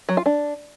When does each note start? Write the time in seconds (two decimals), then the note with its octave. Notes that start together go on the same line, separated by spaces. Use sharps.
0.09 F#3
0.17 F4
0.26 D4